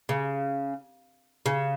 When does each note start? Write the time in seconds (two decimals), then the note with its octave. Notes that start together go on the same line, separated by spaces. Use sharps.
0.09 C#3
1.46 C#3